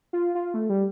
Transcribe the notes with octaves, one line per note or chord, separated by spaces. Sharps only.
F4
F4
A3
G3